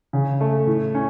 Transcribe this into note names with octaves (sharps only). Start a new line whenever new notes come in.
C#3
A3
A2
C#4